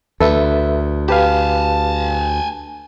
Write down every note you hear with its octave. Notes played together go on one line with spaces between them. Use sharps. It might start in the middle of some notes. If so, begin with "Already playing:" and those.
D2 A4 B4 E5
G4 B4 F5 G#5 A5